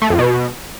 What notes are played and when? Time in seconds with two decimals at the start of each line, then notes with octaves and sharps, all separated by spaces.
0.02 A3
0.10 F2
0.19 B2